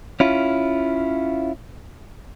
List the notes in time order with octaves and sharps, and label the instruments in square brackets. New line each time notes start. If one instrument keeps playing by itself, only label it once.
[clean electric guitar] C#4 E4 F4